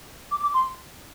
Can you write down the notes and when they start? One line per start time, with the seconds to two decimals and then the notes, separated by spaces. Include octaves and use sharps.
0.31 D6
0.43 D6
0.54 C6